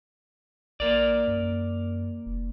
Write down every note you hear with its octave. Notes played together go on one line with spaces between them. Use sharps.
A#1 A#3 A#4 D5
F#2
F1